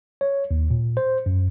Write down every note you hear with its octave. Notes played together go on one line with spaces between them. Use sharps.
C#5
D#2
A#2
C5
F#2